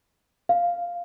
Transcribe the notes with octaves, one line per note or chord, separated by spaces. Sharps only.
F5